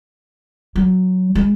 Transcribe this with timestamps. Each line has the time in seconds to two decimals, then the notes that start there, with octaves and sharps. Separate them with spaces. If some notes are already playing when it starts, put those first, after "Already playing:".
0.76 F#3
1.35 G#3